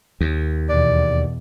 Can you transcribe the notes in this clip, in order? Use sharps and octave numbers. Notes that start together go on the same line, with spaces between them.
D#2
E2 B2 D5